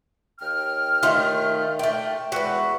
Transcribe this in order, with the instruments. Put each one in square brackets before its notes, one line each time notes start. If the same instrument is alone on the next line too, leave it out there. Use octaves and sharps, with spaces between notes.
[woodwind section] D#2 G5 F6
[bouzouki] D#3 A3 F4
A3 G5
[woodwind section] E2 G#3 E5 [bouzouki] F#4 B4